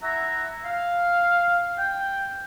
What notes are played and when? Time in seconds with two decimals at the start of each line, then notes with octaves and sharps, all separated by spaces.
0.02 E4 E5 F#5 A#5
0.65 F5
1.77 G5